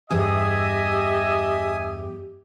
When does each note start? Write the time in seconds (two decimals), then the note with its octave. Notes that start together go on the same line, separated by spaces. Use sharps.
0.10 E2 G2 G4 G#4 D#5 E5 G#5 D#6